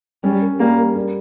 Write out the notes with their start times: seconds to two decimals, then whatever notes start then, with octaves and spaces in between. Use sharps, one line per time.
0.24 G3 C#4
0.42 A#4
0.60 G3 A#3
0.78 A#4
0.96 G3